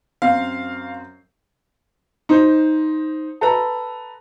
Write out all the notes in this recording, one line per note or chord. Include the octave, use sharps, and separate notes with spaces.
F#2 C4 F5
D#4 C5
A4 B4 A#5